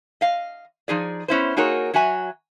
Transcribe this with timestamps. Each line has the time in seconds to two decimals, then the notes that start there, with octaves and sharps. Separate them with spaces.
0.21 D#5 F5
0.88 F3 D#4 G#4 D5
1.28 B3 C#4 E4 C5
1.57 A#3 D#4 F#4 G#4 A#4 C#5
1.94 F#3 F#4 E5 G#5